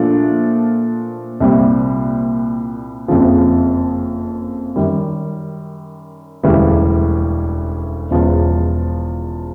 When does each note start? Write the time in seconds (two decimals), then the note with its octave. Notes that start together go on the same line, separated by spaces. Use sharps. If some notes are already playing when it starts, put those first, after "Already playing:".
Already playing: A#2 F3 A3 D4 F4
1.40 C2 A#2 G3 C4
3.08 F#1 F2 C#3 F3
4.76 F#2 D#3 G3
6.43 E1 D2 C#3 E3 G3
8.11 E1 E2 C#3 F3